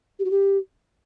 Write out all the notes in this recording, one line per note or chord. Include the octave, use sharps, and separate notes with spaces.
G4
F#4
G4